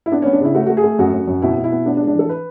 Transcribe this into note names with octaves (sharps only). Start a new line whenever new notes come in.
E4
B3 D4
B3 C#4
D4
C#3 E4
A3 F#4
A3 F#4
G#4
A3
F#2 F#4
F#2
F#2
B2 E4
B2
E4
B3
B3 D4
D4
G#3
D4
E3 A4
B4